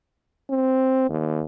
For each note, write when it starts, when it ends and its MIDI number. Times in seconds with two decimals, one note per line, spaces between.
0.50 1.07 60
1.10 1.43 39